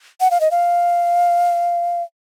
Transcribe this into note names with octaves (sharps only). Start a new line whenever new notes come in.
F#5
F5
D#5
F5